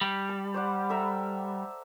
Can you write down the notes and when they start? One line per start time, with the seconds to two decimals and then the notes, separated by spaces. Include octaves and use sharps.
0.01 G3
0.29 A5
0.54 C5 D5 F#5
0.90 A4 E5 A#5